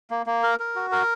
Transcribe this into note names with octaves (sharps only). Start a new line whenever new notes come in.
A#3
A#3
A#4
A#4
F#4
A#4